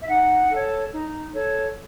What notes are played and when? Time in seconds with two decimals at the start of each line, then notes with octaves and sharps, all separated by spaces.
0.01 E5
0.08 D#4 F#5
0.50 A4 C#5
0.92 D#4
1.34 A4 C#5